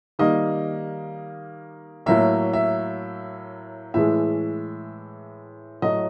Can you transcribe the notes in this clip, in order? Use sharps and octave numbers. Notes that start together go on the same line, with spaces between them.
D#3 G3 A#3 D#5
A2 F#3 A#3 E5
E5
A2 E3 G#3 E5
A2 F#3 A3 D#5